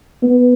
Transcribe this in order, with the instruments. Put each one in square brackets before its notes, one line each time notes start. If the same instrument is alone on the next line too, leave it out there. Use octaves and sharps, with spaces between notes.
[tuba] B3